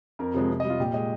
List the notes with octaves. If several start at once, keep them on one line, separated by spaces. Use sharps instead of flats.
F2 A#4
C3 F3 G#3
C3
G3 D#5
F4
A#2 G4
G#3 D#5